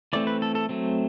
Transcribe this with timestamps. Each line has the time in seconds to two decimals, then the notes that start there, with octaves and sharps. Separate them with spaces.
0.13 E3 A3 C4 D5
0.27 B4
0.42 A4
0.55 A4
0.69 F#3 A3 C4